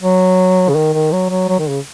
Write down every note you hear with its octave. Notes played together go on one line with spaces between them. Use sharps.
F#3
C#3
D#3
D#3
F#3
F#3
F#3
D#3
C#3